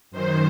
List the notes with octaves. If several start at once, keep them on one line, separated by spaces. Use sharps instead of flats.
F#2 D#3 C5